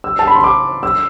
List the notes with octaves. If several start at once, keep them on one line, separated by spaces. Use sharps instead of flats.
E6
A5
B5
C6
D6
E6